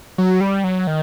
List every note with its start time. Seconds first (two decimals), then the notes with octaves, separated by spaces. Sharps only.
0.18 F#3
0.41 G3
0.64 F#3
0.87 D#3